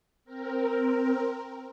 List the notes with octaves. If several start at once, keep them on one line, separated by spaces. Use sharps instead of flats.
C4 A#4